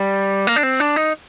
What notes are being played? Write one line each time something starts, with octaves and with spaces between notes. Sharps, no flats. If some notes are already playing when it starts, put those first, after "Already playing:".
Already playing: G3
A#3
D4
C4
D4
D#4